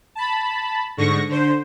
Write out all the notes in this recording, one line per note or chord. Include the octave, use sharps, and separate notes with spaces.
A5 B5
G#2 D3 C#6 A#6
D3 C5